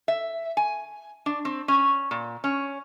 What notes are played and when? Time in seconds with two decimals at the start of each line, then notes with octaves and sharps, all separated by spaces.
0.08 E5
0.57 G#5
1.26 D4
1.45 C4
1.68 C#4
2.11 A#2
2.44 C#4